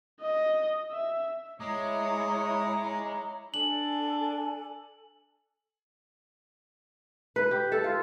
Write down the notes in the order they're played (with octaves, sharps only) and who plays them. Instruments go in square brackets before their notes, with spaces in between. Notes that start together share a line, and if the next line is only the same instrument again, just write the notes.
[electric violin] D#5
E5
[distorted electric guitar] G#3 [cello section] E4 C#5 [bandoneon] D#5 D6 D#6 [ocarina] A#5
[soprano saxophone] D4 [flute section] A4 G#5 [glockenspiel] F#7
[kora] B4
G4
A4
F4